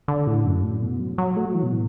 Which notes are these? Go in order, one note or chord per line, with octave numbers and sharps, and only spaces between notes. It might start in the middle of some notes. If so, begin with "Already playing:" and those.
D3
A2
F#2
A2
B2
F#3
F#3
A3
F#3
E3
B2
A2